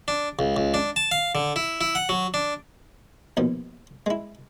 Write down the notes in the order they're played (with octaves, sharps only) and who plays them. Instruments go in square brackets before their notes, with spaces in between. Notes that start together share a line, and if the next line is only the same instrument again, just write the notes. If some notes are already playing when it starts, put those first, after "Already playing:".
[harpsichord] D4
C#2
C#2
D4
A5
F5
D3
E4
E4
F#5
F#3
D4
D#2 B2 F3
G#3 E4